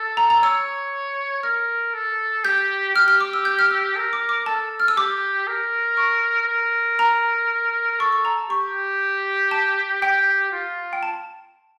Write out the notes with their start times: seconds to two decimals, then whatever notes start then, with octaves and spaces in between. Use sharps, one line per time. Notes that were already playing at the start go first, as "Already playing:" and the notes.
Already playing: A4
0.17 A#5
0.30 A#5
0.43 C#5 E6
1.43 A#4 F6
1.94 A4
2.44 G4 G6
2.95 G4 F6
3.08 F6
3.21 D6
3.33 E6
3.45 G6
3.59 F6
3.71 E6
3.96 A#4 E6
4.13 D6
4.29 D6
4.46 A4 A5
4.80 F6
4.88 E6
4.97 G4 D6
5.47 A#4
5.97 C#6
6.48 A#4
6.99 A#5
7.99 A4 C#6
8.12 C#6
8.25 A#5
8.38 A5
8.50 G4 C#6
9.51 A5
10.02 G4 G5
10.52 F4
10.93 G5
11.03 A5